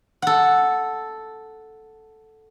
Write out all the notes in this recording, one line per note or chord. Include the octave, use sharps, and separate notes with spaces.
A4 F#5